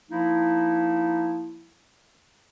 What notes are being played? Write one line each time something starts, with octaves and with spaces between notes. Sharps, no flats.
F3 A#3 D#4 E4